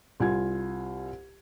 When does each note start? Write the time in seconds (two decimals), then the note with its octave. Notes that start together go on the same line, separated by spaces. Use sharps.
0.20 C2 F4 G#5 G#6